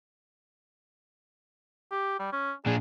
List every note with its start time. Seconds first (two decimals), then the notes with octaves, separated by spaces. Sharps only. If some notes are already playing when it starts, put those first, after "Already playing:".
1.92 G4
2.20 G3
2.33 C#4
2.66 A#2 D4 G#4